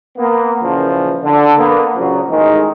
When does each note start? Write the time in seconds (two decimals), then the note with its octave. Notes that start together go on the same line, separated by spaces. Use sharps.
0.17 A#3 B3
0.63 A#2 C#3 E3 F3
1.23 D3
1.58 A#3 B3
1.95 A#2 C#3 F3 F#3
2.29 A1 D#3 G#3